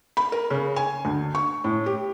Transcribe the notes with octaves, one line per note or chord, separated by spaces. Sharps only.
B5
A#4
C#3
G#5
D2
C#6
A2
G4